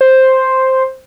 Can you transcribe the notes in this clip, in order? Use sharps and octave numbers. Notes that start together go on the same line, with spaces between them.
C5